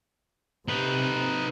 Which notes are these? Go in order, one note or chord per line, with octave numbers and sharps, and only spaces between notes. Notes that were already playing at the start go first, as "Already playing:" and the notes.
C3 D#4 B4